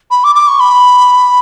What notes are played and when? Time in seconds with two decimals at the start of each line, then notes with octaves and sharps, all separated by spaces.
0.11 B5
0.24 D6
0.35 D6
0.48 C#6
0.60 B5